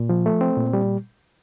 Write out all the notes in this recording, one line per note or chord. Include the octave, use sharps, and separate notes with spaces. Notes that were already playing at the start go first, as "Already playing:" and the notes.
Already playing: A#2
F3
A3
C4
A#2
G3